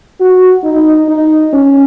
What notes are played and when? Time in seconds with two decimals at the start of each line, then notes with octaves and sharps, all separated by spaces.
0.20 F#4
0.64 D#4
1.09 D#4
1.53 C#4